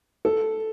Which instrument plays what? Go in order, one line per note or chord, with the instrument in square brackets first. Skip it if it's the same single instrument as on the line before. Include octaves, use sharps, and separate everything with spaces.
[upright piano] A4